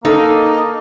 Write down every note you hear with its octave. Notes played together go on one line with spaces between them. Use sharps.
A#3 D#4 A4